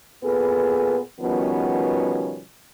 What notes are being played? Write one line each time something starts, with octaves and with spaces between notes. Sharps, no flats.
A#2 B3 G#4 A4 B4
B2 D#3 F3 G3 B3 C#4